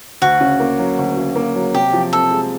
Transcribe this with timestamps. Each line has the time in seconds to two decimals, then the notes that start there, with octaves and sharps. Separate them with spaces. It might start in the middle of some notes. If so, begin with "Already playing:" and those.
0.22 D2 F#4
0.41 C#3
0.60 A#3
0.79 F#3
0.99 D2
1.17 C#3
1.36 A#3
1.56 F#3
1.75 C3 G4
1.93 F3
2.13 C4 A4
2.31 G#3